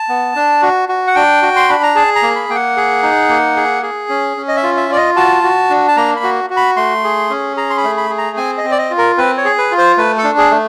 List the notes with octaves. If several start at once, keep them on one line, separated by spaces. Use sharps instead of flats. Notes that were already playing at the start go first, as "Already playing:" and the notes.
Already playing: A5
B3
D4
F#4
F#4
F#5
D4 G5
F#4
C6
D4 B5
A#5
G#4 A5
A#5
A#3
B5
A#3 G5
F#5
G#4
D#4
A#3
G#4
G#4
C#4
C#4
D#5
E5
F4
E5
F4 D5
D#5
F#4 A5
F#4
D4
A5
A#3 A#5
B5
F#4
F#4
B5
A3 C6
G#4
C#4
G#4 A#5
C6
B5
A3
B5
G#4
A#5
C4 G#5
D#5
C4
D5
D#5
F4
A#4
C4 B4
C#5
G#4
B4
F4
C5
A3 B4
A4
D4
G#4
A3